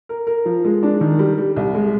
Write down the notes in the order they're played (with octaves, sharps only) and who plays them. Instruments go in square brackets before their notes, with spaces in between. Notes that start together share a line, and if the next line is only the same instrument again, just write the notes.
[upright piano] A#4
A#4
F3
G#3
D4
D#3
G3
G3
C2
G#3